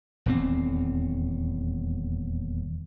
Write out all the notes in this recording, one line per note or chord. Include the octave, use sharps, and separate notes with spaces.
D#1 E2 C4